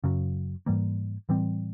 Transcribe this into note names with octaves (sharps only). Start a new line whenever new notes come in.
F#2 C#3 F#3
G#2 E3 G3 A#3
A2 E3 G3 C4